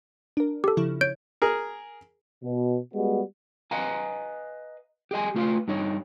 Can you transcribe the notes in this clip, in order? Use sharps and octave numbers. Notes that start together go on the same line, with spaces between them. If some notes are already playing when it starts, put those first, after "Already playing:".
D4 A#4
G4 A4
C#3 F3 E4
C#5 G6 D7
G#4 A#4
B2
G3 G#3 B3 F#4
B4 D#5 F5 G#5 A#5
G4 G#4 D#5 G#5
A3 F4 B4 F5
G2 D#4 C#5